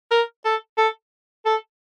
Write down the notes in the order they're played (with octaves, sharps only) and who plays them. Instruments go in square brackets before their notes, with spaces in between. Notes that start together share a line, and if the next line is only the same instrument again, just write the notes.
[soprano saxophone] A#4
A4
A4
A4